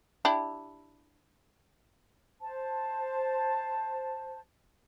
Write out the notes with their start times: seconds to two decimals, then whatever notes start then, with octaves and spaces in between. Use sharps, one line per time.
0.25 D4 E4 G4
2.41 C5 A5